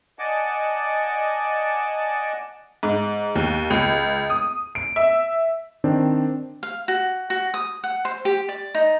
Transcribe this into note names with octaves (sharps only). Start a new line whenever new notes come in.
D5 D#5 F#5 G#5 A5 D6
G#2
D#2
C#2
D#6
D7
E5
D#3 C4 D4
F5
F#4
F#4
D#6
F#5
C5
G4
D5
D#4